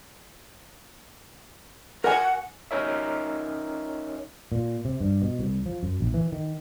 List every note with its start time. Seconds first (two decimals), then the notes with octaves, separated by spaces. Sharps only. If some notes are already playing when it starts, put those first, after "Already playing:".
2.04 A#4 F#5 G#5
2.71 C#4 D#4 A#4 C#5 E5
4.52 A#2
4.85 C3
5.00 G2
5.22 B2
5.39 C2
5.66 F3
5.83 F#2
6.01 A#1
6.14 E3
6.32 D#3